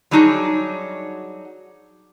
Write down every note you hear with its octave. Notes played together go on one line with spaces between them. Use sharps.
F#3 G3 D4 D#4 F#4 G#4